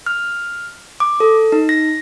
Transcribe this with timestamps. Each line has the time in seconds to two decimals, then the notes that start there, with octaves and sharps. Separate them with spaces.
0.06 F6
1.00 D6
1.20 A4
1.52 D#4
1.69 A#6